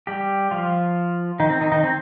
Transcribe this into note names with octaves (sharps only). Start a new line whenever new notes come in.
G3 G4
F3 F4
D#3 D#4
C4
D#3 D#4
D#3 D#4
C4